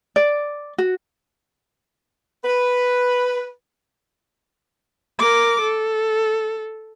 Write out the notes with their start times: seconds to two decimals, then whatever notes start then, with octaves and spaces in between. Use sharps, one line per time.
0.16 D5
0.78 F#4
2.44 B4
5.19 A#4 D6
5.61 A4